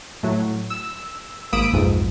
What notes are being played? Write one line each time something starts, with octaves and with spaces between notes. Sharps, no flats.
A2 F#3
E6
G#1 A#3 B5 D#6 E6 D7
B1 F2 G#2